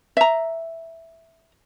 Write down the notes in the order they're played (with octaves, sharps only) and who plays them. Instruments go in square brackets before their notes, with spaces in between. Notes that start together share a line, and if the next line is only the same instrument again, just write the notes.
[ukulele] E5 A#5